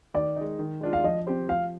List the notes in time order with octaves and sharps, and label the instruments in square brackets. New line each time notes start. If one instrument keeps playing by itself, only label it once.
[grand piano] D#3 [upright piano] D5
[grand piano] G#3 D#4
D#3
G#3 D4 F4
[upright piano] F5
[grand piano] F3 [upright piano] D#5
[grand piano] C4 G4 C5
[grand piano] F3 [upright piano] F5